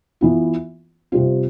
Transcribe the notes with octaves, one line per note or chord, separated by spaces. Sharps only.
E3 B3 F4
C3 G3 C4 F4